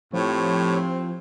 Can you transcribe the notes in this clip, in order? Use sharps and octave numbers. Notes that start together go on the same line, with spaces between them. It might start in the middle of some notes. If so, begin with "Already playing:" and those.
A2 F3 C4 G4 C#5